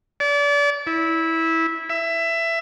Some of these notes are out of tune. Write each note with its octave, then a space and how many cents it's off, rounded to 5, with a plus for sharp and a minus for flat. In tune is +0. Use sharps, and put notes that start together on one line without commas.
D5 -35
E4 -15
E5 +15